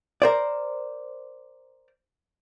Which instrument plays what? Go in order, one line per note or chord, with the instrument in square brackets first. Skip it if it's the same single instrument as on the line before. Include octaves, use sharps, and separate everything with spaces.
[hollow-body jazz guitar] A#4 C5 D5